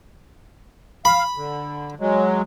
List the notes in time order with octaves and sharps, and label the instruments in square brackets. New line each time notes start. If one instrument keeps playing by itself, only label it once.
[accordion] F5 [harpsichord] B5
[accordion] D3
F#3 G#3